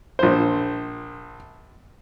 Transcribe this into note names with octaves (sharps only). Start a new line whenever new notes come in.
A#1 C5